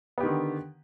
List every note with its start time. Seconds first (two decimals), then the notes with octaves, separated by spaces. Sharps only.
0.18 B3
0.20 G4
0.23 D#3
0.26 D3